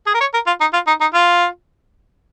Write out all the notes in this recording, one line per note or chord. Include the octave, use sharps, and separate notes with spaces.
G#4
A#4
C#5
A#4
F4
D#4
F4
D#4
D#4
F4